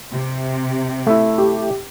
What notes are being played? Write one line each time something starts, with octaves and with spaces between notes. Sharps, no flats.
C3
A3 E4
G4